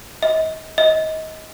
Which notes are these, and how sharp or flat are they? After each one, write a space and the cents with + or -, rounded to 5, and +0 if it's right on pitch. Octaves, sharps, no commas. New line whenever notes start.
D#5 +35
D#5 +25